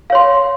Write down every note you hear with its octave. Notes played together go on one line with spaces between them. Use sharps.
C#5 F5 C6